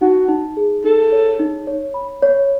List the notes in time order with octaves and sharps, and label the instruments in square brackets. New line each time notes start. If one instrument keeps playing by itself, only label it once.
[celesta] D#4 [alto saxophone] F#4
[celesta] D#4
G#4
[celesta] D#4 [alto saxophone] A4
[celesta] C#5
D#4
C#5
B5
C#5